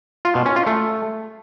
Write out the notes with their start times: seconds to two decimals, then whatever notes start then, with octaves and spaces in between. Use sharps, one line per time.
0.25 F4
0.35 B2
0.46 C#4
0.56 F4
0.67 A3